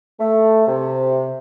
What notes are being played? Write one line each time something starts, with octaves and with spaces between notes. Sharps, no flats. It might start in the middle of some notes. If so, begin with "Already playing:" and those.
A3
C3